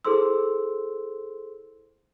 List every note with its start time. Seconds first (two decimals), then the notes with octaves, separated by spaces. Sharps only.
0.05 E4 G#4 A4 C5 C6 E6